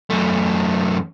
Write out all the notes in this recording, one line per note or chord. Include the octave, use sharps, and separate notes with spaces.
F#2 A3